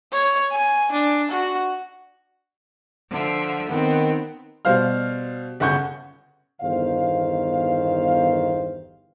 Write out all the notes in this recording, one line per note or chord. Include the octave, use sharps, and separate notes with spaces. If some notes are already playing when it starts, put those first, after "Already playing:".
C#5
G#5
D4
F#4
D3 F3 E5
D#3 B3 C4
B2 G3 C5 F5 F6
G1 C#3 F#5 C#6 G6
G1 E2 D#3 C5 F5